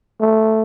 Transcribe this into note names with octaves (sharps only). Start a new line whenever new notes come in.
A3